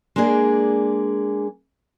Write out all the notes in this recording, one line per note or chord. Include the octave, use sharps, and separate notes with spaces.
G#3 A#3 D4 G#4 D5